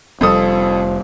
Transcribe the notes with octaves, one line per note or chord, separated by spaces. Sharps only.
F1 F2 F3 G3 A4 D#6